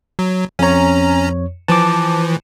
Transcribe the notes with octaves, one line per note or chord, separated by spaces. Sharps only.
F#3
F2 C#4 C#5 A#5
E3 F3 A5 D6